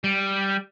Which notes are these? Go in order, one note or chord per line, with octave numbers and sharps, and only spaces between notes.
G3